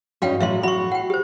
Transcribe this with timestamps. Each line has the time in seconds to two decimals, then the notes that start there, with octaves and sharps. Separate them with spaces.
0.22 G2 C#4 D#4 F#4 F5 G5
0.40 A2 F#3 E5 F5 C6
0.63 F#4 B5 C#6
0.92 F#5 G5
1.10 G4 C5